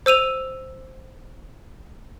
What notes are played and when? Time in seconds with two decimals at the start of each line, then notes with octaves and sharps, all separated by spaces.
0.06 C5 E6 D#7 F7